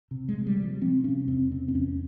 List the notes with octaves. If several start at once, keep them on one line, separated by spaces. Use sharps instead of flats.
C3
G#3
C3
G3
C3
F3
C3 C4
C3 C#4
E2 C4
C3 C4
C4
E2 C#4